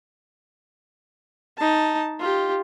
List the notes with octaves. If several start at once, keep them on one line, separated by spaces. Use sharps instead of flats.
D#4 A5
F4 G4